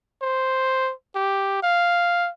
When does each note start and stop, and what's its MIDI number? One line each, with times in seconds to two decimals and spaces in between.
0.22 0.92 72
1.15 1.60 67
1.62 2.29 77